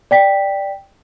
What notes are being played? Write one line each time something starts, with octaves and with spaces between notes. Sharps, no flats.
D5 G5 B6